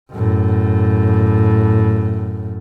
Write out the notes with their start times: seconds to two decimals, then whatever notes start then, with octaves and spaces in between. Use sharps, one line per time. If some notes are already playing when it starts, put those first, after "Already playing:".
0.12 F#2 A2